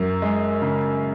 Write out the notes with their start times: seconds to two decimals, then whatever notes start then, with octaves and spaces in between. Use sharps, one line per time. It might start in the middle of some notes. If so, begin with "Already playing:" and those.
Already playing: F#2
0.22 G#3
0.62 C#3